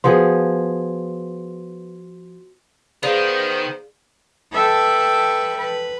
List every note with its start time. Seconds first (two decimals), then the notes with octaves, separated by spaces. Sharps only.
0.04 F3 B3 F#4 G#4 C6
3.03 D#3 B3 G#4 C5 D5 F5
4.52 A4 B4 E5 G5 A5
5.58 B4